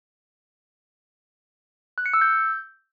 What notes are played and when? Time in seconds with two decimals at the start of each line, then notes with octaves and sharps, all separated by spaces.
1.98 F#6
2.06 C#7
2.14 E6
2.21 G6